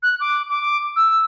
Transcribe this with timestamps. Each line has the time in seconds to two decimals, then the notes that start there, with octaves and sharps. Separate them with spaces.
0.03 F#6
0.20 D6
0.50 D6
0.96 E6